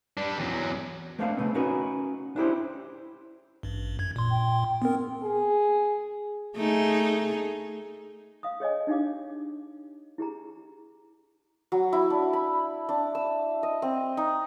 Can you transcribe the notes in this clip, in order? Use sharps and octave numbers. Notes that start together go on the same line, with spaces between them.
G3 D4
E2 F#3
A3 A#3 C4 D4 D5 F5
C#3 A3 B3 C4
C#4 D#4 F#4 A#4 B4
D4 E4 G4 C5
A1 G2
F#2 G#6
A#2 C6
G5
B3 C4 A#4
G#4
A3 D#4 G#4
F5 D#6
G#4 C#5 D#5 G#5
D4 D#4 G4 F5 D6
E4 G4 G#4 A#5
F#3
E4
D4
B5
D4
E6
D#5
C4
D#4